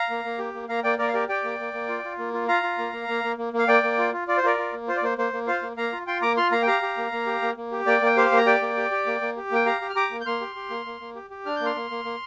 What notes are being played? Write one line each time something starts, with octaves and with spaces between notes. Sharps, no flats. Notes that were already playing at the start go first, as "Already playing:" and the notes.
Already playing: F5 A#5
A#3
A#3
G4
A#3
A#3 F5 A#5
A#3 D5 G5
A#3 A#4 D5
F5
G4 A#4 D5
G4 D5 G5
A#3
A#3
A#3
F4
F4
A#3
F4
F4 F5 A#5
F4
A#3
A#3
A#3
A#3
A#3
A#3
F5
A#3 D5 G5
A#3
F4
F4
F4 D5
C5
F4 A#4 D5
F4
A#3
F4 C5
D5
A#3 C5
A#3 C5
A#3
F4 C5 F5
A#3
A#3 F5 A#5
F4
F4 G5 C6
A#3 A#5 D6
F4 C6 F6
A#3 F5 A#5
G5
G4 F5 A#5
G4
A#3
A#3
G4
A#3
A#3
G4
A#3 D5 G5
A#3 G5
G4 C5 F5
A#3
A#5
G4 D5 G5
A#3
G4
G4
A#3
A#3
G4
A#3 G5
G4 F5 A#5
G4
F6
G4 A#5 D6
A#3
G6
A#3 C6 F6
G4
G4
A#3
A#3
A#3
G4
G4
D4 F6
A#3 G6
C6 F6
A#3
A#3
A#3